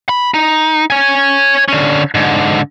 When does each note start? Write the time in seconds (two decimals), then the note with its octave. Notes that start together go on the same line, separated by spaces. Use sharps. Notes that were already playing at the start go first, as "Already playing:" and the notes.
0.09 B5
0.34 D#4
0.90 C#5 G#5
1.68 D3 C#4
2.14 G#2 D3